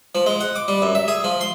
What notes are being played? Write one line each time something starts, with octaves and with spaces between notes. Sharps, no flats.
F3
G#3
F#5
D6
G3
F#2
E5
G#4
F3
C6